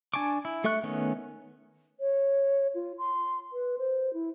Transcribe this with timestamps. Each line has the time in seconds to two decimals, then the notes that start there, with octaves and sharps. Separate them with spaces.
0.14 D4 G#5 A5 C#6 D6
0.45 E4
0.64 A3 A4 E5 C#6 F#6
0.83 D#3 A3 B3 C#4
2.00 C#5
2.75 F4
2.98 C6
3.53 B4
3.78 C5
4.14 E4